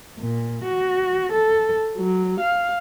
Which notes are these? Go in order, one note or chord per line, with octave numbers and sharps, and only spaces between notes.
A#2
F#4
A4
F#3
F5